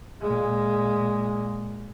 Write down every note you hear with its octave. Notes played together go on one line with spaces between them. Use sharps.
A#2 G#3